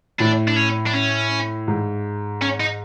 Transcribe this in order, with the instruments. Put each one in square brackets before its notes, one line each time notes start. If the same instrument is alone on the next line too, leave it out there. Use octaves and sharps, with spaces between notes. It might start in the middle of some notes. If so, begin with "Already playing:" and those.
[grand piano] A2 [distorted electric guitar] D4
[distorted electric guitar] D4
C#4
D4
C#4
[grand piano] G#2
[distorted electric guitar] C#4
D#4